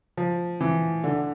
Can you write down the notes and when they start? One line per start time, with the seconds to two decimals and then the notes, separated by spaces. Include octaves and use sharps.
0.17 F3
0.61 E3
1.04 D3